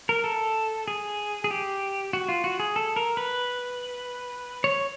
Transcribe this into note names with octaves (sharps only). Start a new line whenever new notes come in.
A#4
A4
G#4
G#4
G4
F#4
F4
F#4
G#4
A4
A#4
B4
C#5